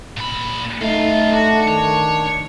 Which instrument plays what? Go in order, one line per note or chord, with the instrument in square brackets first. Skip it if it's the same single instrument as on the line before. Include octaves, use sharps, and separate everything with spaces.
[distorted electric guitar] A#2 B5
[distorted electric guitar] F#2 F4 [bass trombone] A3 [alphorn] D#4
[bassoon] D4 [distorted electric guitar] F#4
[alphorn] D#3 [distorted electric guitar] C#5